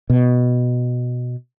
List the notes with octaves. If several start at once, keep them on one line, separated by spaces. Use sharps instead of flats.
B2